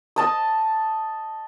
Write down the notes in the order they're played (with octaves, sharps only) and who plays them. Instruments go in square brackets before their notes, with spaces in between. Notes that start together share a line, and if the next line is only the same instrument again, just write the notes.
[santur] D#5 A5 D#6